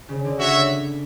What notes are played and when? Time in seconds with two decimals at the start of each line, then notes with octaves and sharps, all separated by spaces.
0.09 C#3
0.25 D3
0.39 F#4 C#5 E5